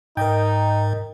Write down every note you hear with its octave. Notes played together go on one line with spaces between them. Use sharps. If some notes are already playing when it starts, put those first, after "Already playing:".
G#2 D#4 A#4 D#5 G5